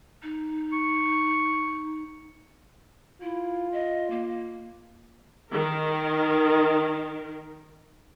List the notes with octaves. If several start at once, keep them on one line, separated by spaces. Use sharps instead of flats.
D#4
C#6
E4 F4
D#5
A#3
D#3 A#4